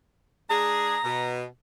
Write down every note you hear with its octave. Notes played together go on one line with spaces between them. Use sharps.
G#3 D4 G#4 A#5
B2